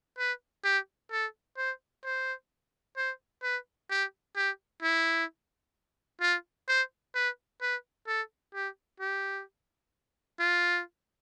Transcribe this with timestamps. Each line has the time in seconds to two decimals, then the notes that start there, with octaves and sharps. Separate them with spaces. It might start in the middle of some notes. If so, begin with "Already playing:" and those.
0.18 B4
0.64 G4
1.11 A4
1.57 C5
2.04 C5
2.97 C5
3.42 B4
3.90 G4
4.36 G4
4.82 E4
6.21 F4
6.68 C5
7.15 B4
7.61 B4
8.07 A4
8.54 G4
9.00 G4
10.39 F4